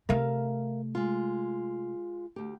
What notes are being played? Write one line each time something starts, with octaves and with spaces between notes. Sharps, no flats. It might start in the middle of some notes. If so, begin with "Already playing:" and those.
C3 A3 A#4 E5 F5
G#3 F4
D2 G4